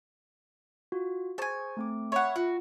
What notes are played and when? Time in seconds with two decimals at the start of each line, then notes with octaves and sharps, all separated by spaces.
0.92 F4 F#4
1.38 G#4 C5 G#5 A5 C#6
1.77 A3 C4 D6
2.12 C#5 E5 F#5 B5
2.36 F4 F#4